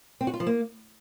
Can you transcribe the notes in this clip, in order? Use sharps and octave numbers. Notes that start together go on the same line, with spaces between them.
C4
F#4
F4
F3
A#3